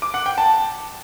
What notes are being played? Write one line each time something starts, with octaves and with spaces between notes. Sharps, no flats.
D6
F#5
G5
A5